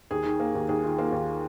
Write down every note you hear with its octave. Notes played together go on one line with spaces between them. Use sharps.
D#2 G#4
D#3
A#3
D#2
D#2 G#4
D#3 F4
A#3 F4
D#2